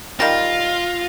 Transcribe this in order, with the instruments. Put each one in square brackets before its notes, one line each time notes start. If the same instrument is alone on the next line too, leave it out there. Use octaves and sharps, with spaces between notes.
[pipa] D#3 G3 [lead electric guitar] F4 [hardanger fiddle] F5 [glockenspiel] A#6